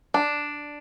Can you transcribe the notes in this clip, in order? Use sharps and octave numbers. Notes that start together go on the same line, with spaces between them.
D4